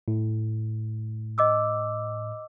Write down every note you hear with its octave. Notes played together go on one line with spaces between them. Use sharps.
A2
D#5 D6 E6